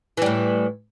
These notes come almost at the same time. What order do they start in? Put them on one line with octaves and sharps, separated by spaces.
E3 G3 A2